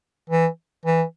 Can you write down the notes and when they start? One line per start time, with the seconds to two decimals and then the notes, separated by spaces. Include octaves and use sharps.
0.30 E3
0.86 E3